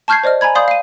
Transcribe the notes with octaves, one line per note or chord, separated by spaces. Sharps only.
A5 C#6 F6 G6 G#6 C7
C5 D5 D#5 F6
G#5 A#5 B5 G#6
D5 F5 B5 C6 D#6 G6
F5 D#7